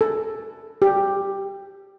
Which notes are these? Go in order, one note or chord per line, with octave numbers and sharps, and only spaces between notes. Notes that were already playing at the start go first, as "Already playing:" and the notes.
A4
G4